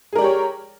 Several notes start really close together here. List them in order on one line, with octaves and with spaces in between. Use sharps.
G#4 A#4 D5 G4 C#5